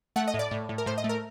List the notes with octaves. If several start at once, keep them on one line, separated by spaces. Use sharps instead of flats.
A3 F#5
D#5
A2
D5
A2
A2
A#4
A2 C5
D#5
A3
A#4